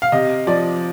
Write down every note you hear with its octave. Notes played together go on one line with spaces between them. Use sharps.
F5
C3 D#5
F3 D5